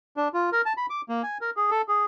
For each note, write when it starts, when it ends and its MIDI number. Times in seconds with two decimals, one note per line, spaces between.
0.17 0.28 62
0.34 0.50 65
0.52 0.62 70
0.65 0.73 81
0.77 0.86 83
0.90 1.01 86
1.09 1.22 58
1.23 1.38 80
1.41 1.50 70
1.57 1.70 68
1.71 1.82 69
1.88 2.06 68